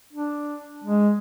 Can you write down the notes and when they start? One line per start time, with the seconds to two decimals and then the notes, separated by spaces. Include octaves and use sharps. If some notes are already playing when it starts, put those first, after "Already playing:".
0.13 D4
0.84 G#3